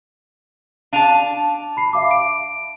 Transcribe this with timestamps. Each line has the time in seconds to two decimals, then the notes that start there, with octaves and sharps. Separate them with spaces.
0.93 D4 F5 A5 D#7 F7
1.77 B5 C7
1.93 E5 F5 D6
2.11 D7